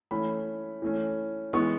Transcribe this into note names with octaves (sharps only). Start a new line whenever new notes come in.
E3 A3 C#4 B5
E3 A3 C#4
E3 G#3 B3 C#6